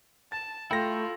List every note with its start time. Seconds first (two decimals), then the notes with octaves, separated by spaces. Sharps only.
0.32 A5 A6
0.71 A3 E4 F4 A4 G5 G6 A#6